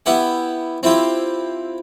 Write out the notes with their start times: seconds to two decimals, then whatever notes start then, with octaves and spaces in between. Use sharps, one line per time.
0.06 B3 E4 G4 F#5
0.83 C4 E4 F4 G4